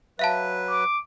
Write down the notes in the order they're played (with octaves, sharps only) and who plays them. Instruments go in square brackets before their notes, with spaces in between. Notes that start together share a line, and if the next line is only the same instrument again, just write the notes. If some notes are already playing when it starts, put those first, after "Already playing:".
[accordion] F#3 B4 [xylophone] E5 F5 A5
[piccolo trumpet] D6